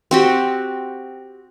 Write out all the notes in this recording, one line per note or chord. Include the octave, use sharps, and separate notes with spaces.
C4 F#4 G4